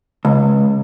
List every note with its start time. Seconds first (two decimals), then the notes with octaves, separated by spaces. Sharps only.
0.25 C#2